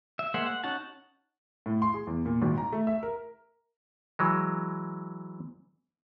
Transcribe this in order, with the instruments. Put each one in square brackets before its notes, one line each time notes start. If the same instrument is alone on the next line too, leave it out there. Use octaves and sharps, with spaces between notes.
[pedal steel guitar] E5
G#3 A#3 C5 E5 F#5
F#5
C#4 D#4 F#4 F#5 A5
[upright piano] A2
C6
G#4
E2
A#2
G#1
A#5
A3
E5
A#4
[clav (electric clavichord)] E3 F#3 G#3